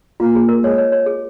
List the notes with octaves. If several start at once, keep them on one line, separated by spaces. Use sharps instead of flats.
A#3 F4
G#4
A#4
G#3 C#5
C#5
C#5
G#4